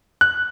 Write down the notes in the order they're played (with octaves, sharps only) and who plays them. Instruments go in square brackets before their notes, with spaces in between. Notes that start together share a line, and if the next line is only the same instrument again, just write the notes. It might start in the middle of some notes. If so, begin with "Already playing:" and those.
[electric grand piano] F#6